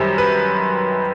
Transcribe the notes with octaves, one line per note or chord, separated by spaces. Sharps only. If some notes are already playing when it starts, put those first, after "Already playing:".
Already playing: F#2 D#3 G3 C5
B4